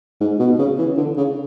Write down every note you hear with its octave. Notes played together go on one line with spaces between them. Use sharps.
G#2
B2
C#3
E3
D3
C#3